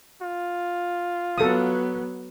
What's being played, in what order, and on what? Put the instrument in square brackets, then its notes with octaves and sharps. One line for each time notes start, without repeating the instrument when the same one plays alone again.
[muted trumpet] F4
[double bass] F#3 B3 [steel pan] A4 D#6